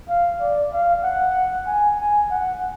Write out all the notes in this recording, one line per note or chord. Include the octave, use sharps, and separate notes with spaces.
F5
D5
F5
F#5
G#5
G#5
F#5